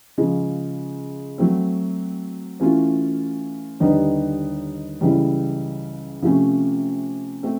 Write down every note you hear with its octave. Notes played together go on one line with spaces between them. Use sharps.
C#3 F3 G#3 C#4
F#3 A3 C4
E3 A3 C#4 F4
D#2 D3 G3 B3 D#4
C#2 C#3 E3 G3
C3 F3 A3 C#4
A3 C4